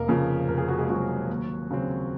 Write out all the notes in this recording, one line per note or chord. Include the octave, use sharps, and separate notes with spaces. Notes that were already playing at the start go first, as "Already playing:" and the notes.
Already playing: F1 A#3 A#4
F2 C#3 F3
F1 A#4
G#4
F#4
G#3 G#4
F2 C#3 F3 F#3 F#4
D#2
C#3 F#3 C4